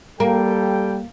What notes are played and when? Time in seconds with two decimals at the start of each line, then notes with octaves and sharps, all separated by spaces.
0.20 G3 A#3 A4 G5